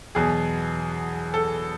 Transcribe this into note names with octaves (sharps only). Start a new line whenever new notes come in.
E2 B2 F#3 G#4
A4